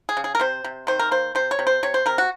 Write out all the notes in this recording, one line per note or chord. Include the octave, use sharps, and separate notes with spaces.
G#4
C#3
G#4
A#4
C3 C5
C3
D#3 C5
A#4
A#3 C5
C3 C5
C#5
C3
C5
C3 C#5
C5
C3 A#4
F#4